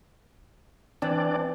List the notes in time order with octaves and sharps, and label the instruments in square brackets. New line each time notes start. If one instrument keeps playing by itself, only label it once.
[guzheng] E3 [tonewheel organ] C4 D4 D5